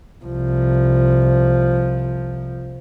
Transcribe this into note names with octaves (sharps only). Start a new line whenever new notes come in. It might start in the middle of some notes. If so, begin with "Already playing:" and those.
C2 F3